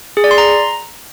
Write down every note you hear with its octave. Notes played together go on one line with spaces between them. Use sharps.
G#4
D5
C6
A#5